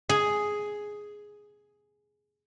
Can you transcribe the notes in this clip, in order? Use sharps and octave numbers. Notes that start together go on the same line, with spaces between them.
G#4